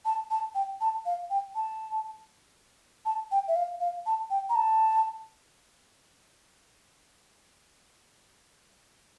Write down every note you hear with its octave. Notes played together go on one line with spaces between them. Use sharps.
A5
A5
G5
A5
F5
G5
A5
A5
G5
E5
F5
F5
A5
G5
A#5
A5